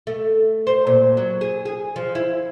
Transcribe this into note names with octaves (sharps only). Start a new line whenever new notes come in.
A3
C5
A#2
F#3
G#4
G#4
F3
E4